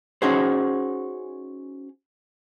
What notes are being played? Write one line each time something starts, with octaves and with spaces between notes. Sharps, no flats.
C#4 D#4 F#4 G#4 C5